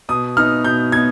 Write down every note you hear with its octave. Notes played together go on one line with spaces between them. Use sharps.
B2 D#6
B3 D#4 F6
B2 G6
B3 D#4 G#6